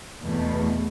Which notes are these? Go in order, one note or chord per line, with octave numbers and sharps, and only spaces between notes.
E2 B2 A3